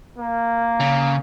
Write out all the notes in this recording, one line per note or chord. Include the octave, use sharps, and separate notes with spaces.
A#3
C#3